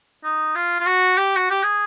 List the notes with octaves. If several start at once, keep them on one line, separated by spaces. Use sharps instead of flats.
D#4
F4
F4
F#4
G4
F#4
G4
G#4